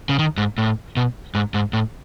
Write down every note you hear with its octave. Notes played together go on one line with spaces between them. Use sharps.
C#3
D#3
G#2
A2
B2
G#2
G#2
A2